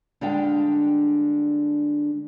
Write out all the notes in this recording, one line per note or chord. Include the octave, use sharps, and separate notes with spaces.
D3 G3 G#3 D4 F5 G5